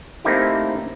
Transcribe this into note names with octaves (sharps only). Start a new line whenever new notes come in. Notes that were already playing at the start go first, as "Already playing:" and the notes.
A3 A#3 C4 D#4 E4 G4